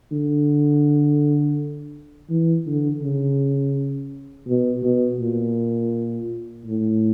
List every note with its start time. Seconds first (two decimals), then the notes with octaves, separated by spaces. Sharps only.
0.12 D3
2.30 E3
2.66 D3
3.02 C#3
4.48 B2
4.83 B2
5.20 A#2
6.66 A2